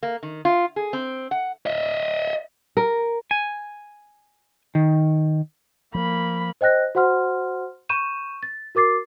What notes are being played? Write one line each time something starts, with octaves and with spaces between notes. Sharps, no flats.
A#3
D#3
F4
G#4
C4
F#5
D#5 E5
A#4
G#5
D#3
F3 A#3 B5
C5 D#5 G5 F#6 A#6
F#4 C5 F#5 C6 F6
B5 C#6 G6 D#7 E7
A6
F#4 A#4 D6 A6 C7